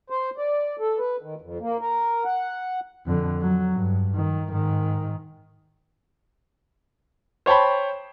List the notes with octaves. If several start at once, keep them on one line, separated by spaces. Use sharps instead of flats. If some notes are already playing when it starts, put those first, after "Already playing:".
C5
D5
A4
B4
D#3
F2
A#3
A#4
F#5
F2 D3
F#3
G2
D#3
G#2 D#3
C5 C#5 G5 A5 B5